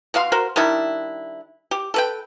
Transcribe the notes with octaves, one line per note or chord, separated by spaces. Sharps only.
B2 F#4 F5 C6
F#4 A#4 C5
D#3 G3 D4 E4
G4
A4 B4 G5